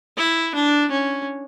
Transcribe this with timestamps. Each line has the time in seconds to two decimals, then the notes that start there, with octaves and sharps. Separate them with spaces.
0.17 E4
0.55 D4
0.91 C#4